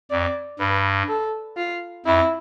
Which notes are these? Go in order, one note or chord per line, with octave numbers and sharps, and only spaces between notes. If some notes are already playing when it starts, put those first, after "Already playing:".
F2 D5
G2 B4
A4
F4
F2 E4